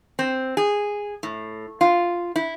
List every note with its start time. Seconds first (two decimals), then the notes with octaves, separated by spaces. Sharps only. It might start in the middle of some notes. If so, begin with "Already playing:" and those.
0.19 C4
0.57 G#4
1.23 A2
1.81 F4
2.36 E4